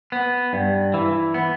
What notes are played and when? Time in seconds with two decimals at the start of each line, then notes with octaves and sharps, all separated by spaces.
0.12 B3
0.53 G2
0.94 E3
1.34 B3